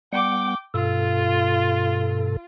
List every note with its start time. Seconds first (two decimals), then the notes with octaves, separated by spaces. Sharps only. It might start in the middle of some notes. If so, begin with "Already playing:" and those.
0.13 G3 B3 F#5 G5 D6
0.74 G2 B2 F4 A4